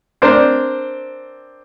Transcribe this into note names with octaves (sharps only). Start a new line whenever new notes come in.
C4 D4 A#4 C5